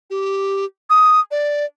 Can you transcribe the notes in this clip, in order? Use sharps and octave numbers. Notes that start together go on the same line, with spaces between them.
G4
D#6
D5